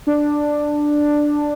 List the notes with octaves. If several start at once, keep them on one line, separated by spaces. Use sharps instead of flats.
D4